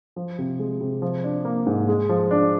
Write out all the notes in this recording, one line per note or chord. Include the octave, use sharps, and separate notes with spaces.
F3
C3
G#3
C3
F3
D4
A#3
G#2
G#3
F3
D4